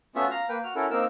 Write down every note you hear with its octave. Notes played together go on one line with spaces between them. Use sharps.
A3 B3 C#4 F4 F#4 E5
F5 A#5
A#3 B4 G5
F#4 F6
C#4 E4 F#4 A4 A#4
A#3 C4 D#4 A#4 E6